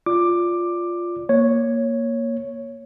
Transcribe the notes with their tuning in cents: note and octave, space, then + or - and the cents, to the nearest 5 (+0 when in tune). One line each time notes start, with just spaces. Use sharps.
F4 +0 D5 -10 D6 +10
A#3 +5 C#5 +0